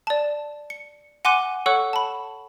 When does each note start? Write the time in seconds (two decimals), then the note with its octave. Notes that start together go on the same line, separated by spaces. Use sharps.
0.07 D5 A5
0.70 C#7
1.25 F#5 G#5 C6 D6 F#6 D#7
1.66 A4 C#5 F#5 C#6 E6 F#6
1.93 A5 B5